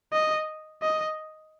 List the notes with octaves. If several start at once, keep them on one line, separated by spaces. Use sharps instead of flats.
D#5
D#5